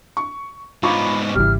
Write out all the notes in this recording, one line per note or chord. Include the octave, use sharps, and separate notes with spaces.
C#6
G#2 B3 F4 B5 C#6 D6
G#1 C#3 E3 G3 F6